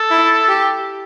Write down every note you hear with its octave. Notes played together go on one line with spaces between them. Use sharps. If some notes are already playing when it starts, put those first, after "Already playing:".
Already playing: A4
E4
G4